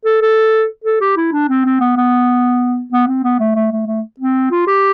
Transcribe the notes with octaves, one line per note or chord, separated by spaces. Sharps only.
A4
A4
A4
G4
E4
D4
C4
C4
B3
B3
B3
C4
B3
A3
A3
A3
A3
C4
F4
G4